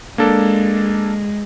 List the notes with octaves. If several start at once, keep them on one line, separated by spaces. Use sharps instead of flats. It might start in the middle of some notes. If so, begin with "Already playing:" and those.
G#3 A#3 D4 A4